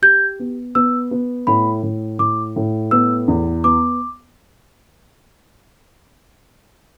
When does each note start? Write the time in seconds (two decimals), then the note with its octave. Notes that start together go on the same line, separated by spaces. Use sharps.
0.02 G4 G6
0.40 B3
0.75 B3 E6
1.11 B3
1.47 A2 B5
1.83 A2
2.19 A2 D6
2.56 A2
2.91 B3 E6
3.28 E2
3.64 B3 D6